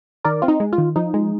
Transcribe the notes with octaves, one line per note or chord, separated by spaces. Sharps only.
D#3 A#4 D5
C4 F4
D#4
G#3
F4
D#3
F3 D#4
G#3